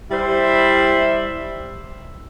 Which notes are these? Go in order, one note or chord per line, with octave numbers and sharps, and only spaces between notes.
G3 E4 C5 E5